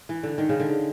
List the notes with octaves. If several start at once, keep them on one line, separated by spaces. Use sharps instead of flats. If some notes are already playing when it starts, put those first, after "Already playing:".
E3
D3
D#3
C#3
D3